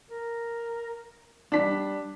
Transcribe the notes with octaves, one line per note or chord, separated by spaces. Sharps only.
A#4
G3 D4 B6